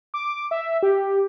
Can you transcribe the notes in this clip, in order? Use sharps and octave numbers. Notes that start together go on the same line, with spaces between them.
D6
E5
G4